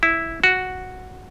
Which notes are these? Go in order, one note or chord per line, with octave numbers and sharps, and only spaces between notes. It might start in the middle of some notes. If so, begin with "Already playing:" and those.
E4
F#4